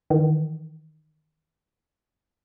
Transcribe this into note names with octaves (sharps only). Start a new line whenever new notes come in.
D#3 E3